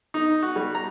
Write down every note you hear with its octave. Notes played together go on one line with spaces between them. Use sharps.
D#4
F#4
G3
A#5